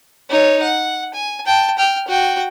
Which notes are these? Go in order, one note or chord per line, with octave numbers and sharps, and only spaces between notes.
D#4 C#5
F#5
G#5
G5 A5
G5 F6
F#4 G5